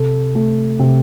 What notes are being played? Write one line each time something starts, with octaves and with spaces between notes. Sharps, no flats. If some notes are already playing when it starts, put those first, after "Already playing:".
Already playing: C3 A4
A3
C3